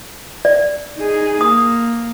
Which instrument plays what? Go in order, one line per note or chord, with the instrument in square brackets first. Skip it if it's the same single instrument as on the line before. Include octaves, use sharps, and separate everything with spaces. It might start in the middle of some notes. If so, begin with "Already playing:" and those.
[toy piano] D5
[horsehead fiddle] D#4 G#4
[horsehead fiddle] A#3 [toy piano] D#6